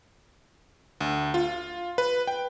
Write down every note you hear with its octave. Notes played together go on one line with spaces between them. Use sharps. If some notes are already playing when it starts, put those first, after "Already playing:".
D2
F4
B4
G5